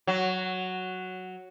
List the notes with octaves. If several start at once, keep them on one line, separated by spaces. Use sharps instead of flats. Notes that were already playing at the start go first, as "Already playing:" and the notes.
F#3